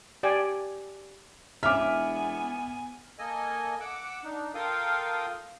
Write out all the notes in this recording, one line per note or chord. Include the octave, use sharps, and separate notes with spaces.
G4 D5 G5 G#5
E1 B3 E5 G#5 D6 F6
A#3 A4 D#5 G#5
F#5 D6 E6
D4 D#4
F4 A4 A#4 F5 G5 D#6